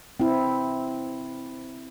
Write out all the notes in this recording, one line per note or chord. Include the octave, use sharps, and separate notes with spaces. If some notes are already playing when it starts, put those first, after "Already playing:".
C4 E4